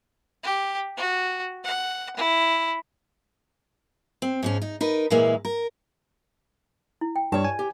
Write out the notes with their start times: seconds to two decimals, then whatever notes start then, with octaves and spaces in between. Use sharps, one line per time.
0.43 G4
0.97 F#4
1.64 F#5
2.17 E4
4.22 C4
4.43 G#2 F3 C#4
4.62 D#4
4.81 D#4 A#4 B4
5.10 A#2 E3 G#3 A#3 E4 F5
5.45 A#4
7.01 E4
7.16 G5
7.32 G2 G4 B4 C#5 D5 A5
7.45 G#5
7.59 G4